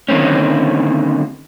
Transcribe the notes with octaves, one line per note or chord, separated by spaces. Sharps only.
D3 D#3 G#3 A#3 C4 C#4